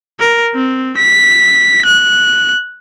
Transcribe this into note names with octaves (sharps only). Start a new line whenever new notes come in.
A#4
C4
B6
F#6